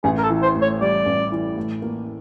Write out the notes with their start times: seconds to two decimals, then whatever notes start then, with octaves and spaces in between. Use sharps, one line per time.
0.04 A1 G#4
0.18 A#4
0.23 A4
0.30 E3
0.42 C5
0.55 A2
0.62 C#5
0.81 G3 D5
1.06 A1
1.32 E3
1.57 A2
1.82 A#3